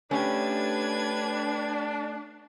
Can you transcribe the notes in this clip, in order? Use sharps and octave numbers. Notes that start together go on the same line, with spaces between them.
A3 C#4 D4 G4 B4 G#6